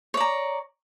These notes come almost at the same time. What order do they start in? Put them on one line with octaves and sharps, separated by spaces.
C#5 D5 A#5